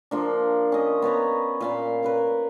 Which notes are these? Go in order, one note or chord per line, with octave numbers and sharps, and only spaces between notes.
F3 A#3 D4
C#4 D#5
B3 B4 C#5 A#5
A#2 F5 B5
C#4 A#4 B4